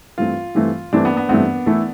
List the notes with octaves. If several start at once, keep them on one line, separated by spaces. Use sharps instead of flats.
G2 E3 A3 C4 F4
G2 E3 A3 C4
G2 E3 A3 C4 D4
B3
B3
G2 E3 A3 B3 C4
E3 A3 E4 A4